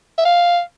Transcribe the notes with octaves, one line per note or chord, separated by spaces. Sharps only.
E5
F5